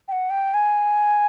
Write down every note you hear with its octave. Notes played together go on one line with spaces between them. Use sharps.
G5
F#5
G5
G#5